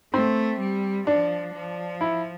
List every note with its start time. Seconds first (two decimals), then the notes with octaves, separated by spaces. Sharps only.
0.13 A3 C4
0.60 G3
1.07 F3 D4
1.54 F3
2.01 E4